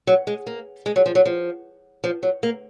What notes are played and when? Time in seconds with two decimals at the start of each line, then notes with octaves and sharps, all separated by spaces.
0.07 F#3
0.27 G#3
0.47 A#3
0.86 G#3
0.96 F#3
1.06 F3
1.15 F#3
1.25 F3
2.04 F3
2.23 F#3
2.43 A#3